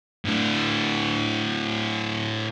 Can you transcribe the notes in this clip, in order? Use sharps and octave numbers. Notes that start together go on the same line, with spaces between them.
A2 D4